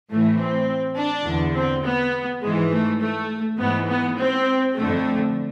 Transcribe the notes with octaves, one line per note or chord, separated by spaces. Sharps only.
A2 E3 A3
C4
D4
E2 D3
C4
B3
G#2 E3 G#3
A3
A3
G#2 E3 B3
B3
C4
F2 D3 A3